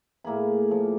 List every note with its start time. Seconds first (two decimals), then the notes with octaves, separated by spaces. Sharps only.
0.24 A2 A#3 G#4 B5
0.71 F3